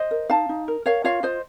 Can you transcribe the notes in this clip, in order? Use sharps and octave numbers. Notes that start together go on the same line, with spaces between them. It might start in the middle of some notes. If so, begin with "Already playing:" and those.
Already playing: C5 D#5
A#4
D#4 F5 A5
D#4
A#4
A#4 C#5 F5
F4 C#5 F5
F4 C5 D#5